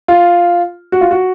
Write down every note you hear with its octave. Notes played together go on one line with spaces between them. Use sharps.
F4
F#4
F4
F#4